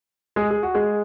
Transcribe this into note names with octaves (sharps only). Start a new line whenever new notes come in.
G#3 G#4
G#4
F#4
G#3 G#4